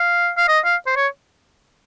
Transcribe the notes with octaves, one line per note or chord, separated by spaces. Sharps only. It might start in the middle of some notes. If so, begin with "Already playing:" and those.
Already playing: F5
F5
D#5
F5
C5
C#5